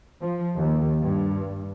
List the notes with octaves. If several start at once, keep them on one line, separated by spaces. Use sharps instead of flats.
F3
D#2
G2